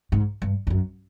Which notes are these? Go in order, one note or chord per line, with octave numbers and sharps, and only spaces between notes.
G#2
G2
F2
F#2